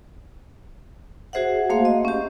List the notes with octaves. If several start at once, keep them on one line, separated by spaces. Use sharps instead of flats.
F#4 G#4 C5 E5 F#5
A3 A#3 F5 C6
D#5
C#4 G4